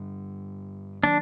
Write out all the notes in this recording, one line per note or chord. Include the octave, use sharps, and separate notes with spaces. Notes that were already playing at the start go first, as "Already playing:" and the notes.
Already playing: G2 D3 G3
D#3 F#3 A#3 D4